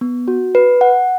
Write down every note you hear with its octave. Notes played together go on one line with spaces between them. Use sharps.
B3
F#4
B4
F#5